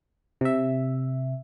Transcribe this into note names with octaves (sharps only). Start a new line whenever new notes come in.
C3 E5